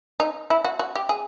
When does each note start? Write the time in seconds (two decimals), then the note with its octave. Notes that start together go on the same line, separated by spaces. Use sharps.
0.20 D#4
0.50 E4
0.64 F#4
0.79 F#4
0.95 G4
1.09 G#4